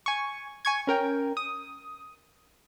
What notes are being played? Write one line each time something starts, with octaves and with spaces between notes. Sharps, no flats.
G#5 C#6
G#5 C#6 G#6
C#4 A#4 G5
D#6